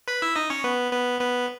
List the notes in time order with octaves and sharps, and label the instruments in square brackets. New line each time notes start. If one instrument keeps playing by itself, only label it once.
[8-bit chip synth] B4 B5
E4 E5
D#4 D#5
C#4 C#5
B3 B4
B3 B4
B3 B4